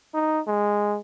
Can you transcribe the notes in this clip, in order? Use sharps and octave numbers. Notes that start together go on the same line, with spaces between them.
D#4
G#3